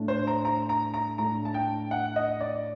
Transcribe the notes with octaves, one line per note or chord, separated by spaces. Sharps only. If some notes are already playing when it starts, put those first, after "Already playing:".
Already playing: A2 A3 D4
C5
A#5
A#5
A#5
A#5
A2 A3 D4 A#5
A5
G5
F#5
D#5
D5